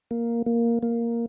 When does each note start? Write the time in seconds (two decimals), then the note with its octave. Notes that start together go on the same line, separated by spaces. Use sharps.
0.11 A#3
0.46 A#3
0.83 A#3